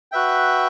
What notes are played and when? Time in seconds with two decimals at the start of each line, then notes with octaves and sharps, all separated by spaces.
0.12 F#4 B4 E5 G5